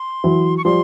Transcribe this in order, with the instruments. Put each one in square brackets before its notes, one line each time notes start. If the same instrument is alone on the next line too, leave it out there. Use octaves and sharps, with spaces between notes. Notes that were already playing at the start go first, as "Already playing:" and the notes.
Already playing: [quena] C6
[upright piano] E3 F#3
[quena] C#6
[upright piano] F3 G3 [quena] C6